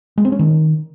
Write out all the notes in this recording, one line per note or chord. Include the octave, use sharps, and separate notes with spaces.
G#3
C4
C#4
D#3